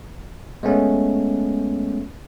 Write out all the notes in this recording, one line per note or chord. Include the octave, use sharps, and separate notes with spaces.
G#3 A3 B3 C#4